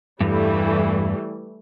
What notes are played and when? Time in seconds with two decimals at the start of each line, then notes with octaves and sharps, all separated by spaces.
0.21 E2 G2 E3 G3 A3